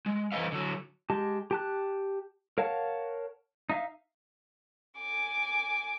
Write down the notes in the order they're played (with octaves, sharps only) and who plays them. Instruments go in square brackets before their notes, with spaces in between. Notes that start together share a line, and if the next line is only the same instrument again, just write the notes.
[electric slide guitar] G#3
E3 B4 C5 D#5 F5
D3 F#3
[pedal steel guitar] G#3 G4 A5
G4 A5 F#6
A#4 C#5 F5 F#5 A5
D#4 E5 F5
[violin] G#5 D6